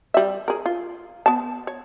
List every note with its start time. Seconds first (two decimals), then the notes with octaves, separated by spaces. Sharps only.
0.14 G3 E5
0.48 G#4 A#4
0.66 F4
1.26 B3 A5
1.67 C#5